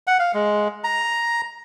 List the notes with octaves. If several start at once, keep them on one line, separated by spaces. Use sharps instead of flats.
F#5
F5
G#3
A#5